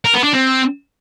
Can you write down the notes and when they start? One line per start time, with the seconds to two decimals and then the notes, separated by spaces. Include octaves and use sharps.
0.05 A#4
0.14 B3
0.24 D4
0.34 C4